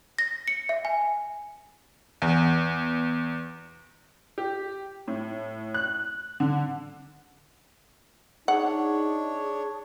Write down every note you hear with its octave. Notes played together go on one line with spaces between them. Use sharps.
A#6
C#7
E5
G#5
E2
G4
A2
F#6
D3
D4 D#4 G#4 C#5 F#5